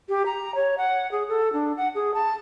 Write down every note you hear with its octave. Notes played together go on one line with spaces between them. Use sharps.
G4
A#5
C#5
F#5
G#4
A4
D4
F#5
G#4
A5